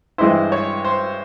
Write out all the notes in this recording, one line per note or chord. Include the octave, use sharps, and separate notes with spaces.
G2 E3 G#3 E4 C5
C#5
C5